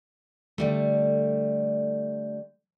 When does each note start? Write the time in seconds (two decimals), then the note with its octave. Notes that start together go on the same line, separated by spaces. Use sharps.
0.58 D3 G3 A3